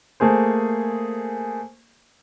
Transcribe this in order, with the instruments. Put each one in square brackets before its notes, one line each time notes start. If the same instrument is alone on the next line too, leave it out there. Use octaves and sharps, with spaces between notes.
[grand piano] A3 A#3 G#4 C5